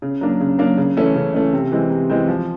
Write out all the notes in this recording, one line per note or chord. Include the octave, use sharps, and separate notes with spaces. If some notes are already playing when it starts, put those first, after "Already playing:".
C#3
F#3 A#3 D4
C#3
F#3 A#3 D4
C#3
E3 A3 C#4
C#3
E3 A3 C#4
C3
E3 G#3 C4
C3
E3 G#3 C4
F3